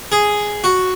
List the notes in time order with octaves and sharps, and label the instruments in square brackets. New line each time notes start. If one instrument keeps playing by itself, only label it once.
[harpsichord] G#4
F#4